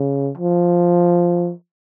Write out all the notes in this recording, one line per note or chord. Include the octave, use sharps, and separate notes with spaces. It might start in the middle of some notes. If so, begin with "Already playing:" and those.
Already playing: C#3
F3